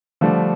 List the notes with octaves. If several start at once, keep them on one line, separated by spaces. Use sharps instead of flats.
D3 F3 G3 A3 D4